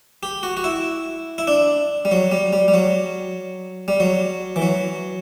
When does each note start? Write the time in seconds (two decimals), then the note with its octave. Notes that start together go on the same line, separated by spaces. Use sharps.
0.23 G4
0.43 F#4
0.57 F#4
0.64 E4
1.38 E4
1.47 D4
2.05 G3
2.11 F#3
2.32 G3
2.53 G3
2.68 G3
2.74 F#3
3.88 G3
4.00 F#3
4.56 E3
4.62 F#3